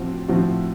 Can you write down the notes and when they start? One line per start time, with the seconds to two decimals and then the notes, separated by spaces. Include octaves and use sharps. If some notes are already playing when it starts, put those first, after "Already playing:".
Already playing: A2 F3 C4 F#4
0.28 A2 F3 C4 F#4